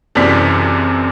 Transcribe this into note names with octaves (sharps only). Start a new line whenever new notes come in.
F#1 F#2 C3 E3 D5 B6